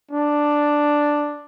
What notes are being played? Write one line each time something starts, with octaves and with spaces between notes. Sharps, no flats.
D4